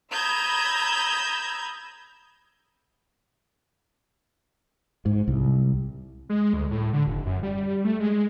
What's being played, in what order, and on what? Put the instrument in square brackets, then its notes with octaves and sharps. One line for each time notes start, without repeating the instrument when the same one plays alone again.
[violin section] A#5 B5 D#6 E6 G6 G#6
[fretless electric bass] G#2
C2
[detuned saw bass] G#3
D2
A2
D3
F1
F#2
G3
A3
G#3